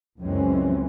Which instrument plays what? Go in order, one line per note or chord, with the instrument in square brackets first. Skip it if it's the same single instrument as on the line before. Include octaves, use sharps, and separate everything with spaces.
[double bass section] C#2 F#2 E3 G#3 C4 C#4